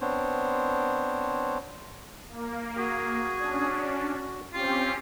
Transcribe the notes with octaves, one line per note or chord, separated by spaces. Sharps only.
B3 C4 D4 C5 C#5
A#3
F#4 G#4
C#4 D4
C4 C#4 F4 G4